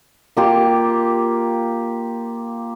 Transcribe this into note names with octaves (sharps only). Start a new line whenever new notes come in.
A#3 F4 G4